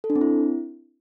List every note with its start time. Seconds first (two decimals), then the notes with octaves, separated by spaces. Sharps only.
0.04 A4
0.10 D4
0.16 C4
0.21 E4